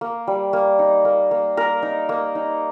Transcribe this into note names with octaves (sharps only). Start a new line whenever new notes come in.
A#3
G3
A#3
D#4
A#3
A#3
A#3 A#4
D#4
A#3
D#4